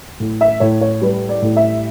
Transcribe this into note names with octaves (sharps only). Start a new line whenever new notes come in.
A2
E5
A2 C#5
C#5
G3 B4
D5
A2
E5